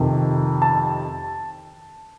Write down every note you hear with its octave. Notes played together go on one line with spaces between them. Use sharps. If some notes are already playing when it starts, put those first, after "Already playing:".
Already playing: F2 C3 D#3
A5